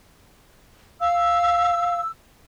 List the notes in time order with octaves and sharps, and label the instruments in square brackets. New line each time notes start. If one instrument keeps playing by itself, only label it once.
[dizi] F5 [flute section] E6